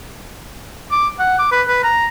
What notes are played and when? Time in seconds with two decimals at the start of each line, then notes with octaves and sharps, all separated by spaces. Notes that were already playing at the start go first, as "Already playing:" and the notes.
0.91 D6
1.19 F#5
1.39 D6
1.52 B4
1.67 B4
1.84 A#5